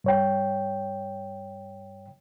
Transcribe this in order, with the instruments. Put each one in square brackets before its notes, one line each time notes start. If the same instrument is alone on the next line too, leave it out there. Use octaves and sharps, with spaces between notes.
[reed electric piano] G2 C#5 G5